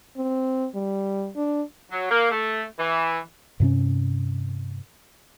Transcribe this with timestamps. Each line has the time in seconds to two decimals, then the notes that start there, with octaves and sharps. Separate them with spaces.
0.17 C4
0.75 G3
1.36 D4
1.91 F#3
2.11 A#3
2.31 A3
2.79 E3
3.60 G2 C3 C4 C#4